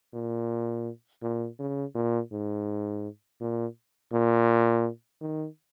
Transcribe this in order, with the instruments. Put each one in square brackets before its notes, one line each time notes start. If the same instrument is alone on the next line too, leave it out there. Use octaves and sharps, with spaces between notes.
[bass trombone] A#2
A#2
C#3
A#2
G#2
A#2
A#2
D#3